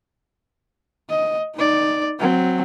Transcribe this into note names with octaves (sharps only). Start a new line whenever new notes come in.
D#5
D#4 D5
F#3 C4